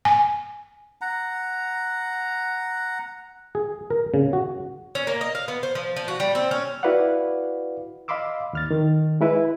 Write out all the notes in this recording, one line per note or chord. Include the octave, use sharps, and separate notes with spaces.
G#5
F#5 A#5
G#4
A#4
C#3
F#4
C#4
A#3
D#5
F5
B3
C5
F3
F3
F#4
G3
C4
C#4
E4 F#4 B4 D5 F5 F#5
D#5 F5 B5 C6 D6 E6
D#2 F6 A6
D#3
G#3 E4 B4